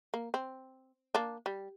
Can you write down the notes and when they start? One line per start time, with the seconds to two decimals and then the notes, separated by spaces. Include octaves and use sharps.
0.14 A#3
0.34 C4
1.15 A#3 D4
1.46 G3